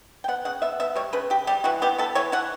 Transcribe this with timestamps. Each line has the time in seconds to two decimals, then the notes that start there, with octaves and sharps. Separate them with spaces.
0.24 G5
0.28 B3 F#5
0.45 C#3 F#5
0.62 B3 E5
0.80 B3 E5
0.96 G3 C#5
1.13 C#3 B4
1.30 C#3 G4
1.47 G3 G4
1.64 E3 F#4
1.82 B3 G4
1.98 B3 A4
2.15 E3 C#5
2.32 E3 F#5